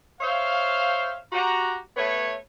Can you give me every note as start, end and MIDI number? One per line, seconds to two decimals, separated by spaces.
0.21 1.16 72
0.21 1.16 73
0.21 1.16 76
0.21 1.16 77
1.33 1.78 66
1.33 1.78 67
1.33 1.78 82
1.97 2.34 57
1.97 2.34 59
1.97 2.34 71
1.97 2.34 73